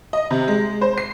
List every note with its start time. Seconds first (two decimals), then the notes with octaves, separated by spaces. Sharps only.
0.13 D#5
0.31 C3
0.48 G#3
0.81 C5
0.98 C7